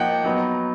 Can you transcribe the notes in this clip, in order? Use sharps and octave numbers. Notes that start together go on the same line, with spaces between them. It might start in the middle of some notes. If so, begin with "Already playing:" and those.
Already playing: F3 A#3 D#4 F#5 G5
F#3 B3 D#4